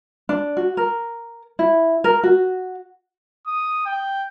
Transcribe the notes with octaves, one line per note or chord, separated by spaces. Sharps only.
D4
F#4
A#4
E4
A#4
F#4
D#6
G5